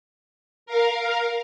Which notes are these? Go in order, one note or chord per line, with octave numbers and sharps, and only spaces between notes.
A#4 F5